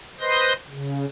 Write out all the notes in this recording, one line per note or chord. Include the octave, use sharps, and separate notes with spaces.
B4 C5 D#5 C6 G6 A#6
C#3